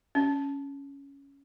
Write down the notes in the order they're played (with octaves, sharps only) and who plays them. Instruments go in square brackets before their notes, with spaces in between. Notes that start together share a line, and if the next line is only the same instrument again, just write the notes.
[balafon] C#4